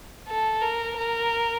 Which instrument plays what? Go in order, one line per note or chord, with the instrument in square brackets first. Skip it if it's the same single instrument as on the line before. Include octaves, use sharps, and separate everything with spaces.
[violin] A4
A#4
A#4